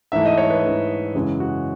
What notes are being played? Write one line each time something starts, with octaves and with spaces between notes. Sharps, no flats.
G#2 E3 A3 E5
D#5
C#5
B4
G#2 E3 A3
F#2 C#3 E3 G#3
F#4